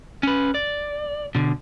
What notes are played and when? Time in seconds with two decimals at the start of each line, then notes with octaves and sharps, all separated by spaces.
0.23 C#4 B4
0.54 D5
1.35 B2 D3